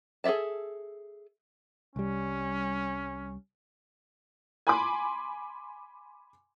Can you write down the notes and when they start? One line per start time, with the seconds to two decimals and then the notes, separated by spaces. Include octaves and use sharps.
0.24 G#4 A4 D5 E5 A5
1.96 C2 G3 C#4
4.67 G#5 B5 C6 D6